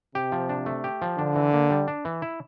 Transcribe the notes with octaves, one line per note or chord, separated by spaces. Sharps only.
C3 G4
F3
D4
A3
G4
F3
D3 D4
E3
A#3
G3
D4
E3
E4